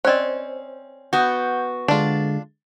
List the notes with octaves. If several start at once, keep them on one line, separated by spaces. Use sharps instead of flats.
C4 C#4 C5 D5 D#5
B3 F#4 G6
D3 G#3 D4 F4